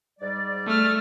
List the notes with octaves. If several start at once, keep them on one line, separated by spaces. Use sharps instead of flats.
G#2 G3 D5
A3 F6